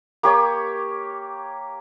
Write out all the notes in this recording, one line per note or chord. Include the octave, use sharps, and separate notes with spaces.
A#3 G4 C#5